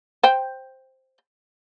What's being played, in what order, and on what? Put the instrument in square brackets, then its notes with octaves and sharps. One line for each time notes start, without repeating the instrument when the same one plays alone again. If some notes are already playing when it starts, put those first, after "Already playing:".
[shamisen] C5 G5